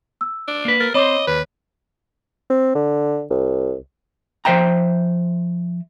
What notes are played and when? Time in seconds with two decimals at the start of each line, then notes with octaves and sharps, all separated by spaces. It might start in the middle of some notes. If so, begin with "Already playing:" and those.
0.21 E6
0.48 D4
0.65 A#3 B4
0.80 A#4 A6
0.94 C4 C5 C#5 D#5 B5 D6
1.28 D#2 B4
2.50 C4
2.75 D3
3.30 C2
4.45 F3 C5 E5 G5 A#5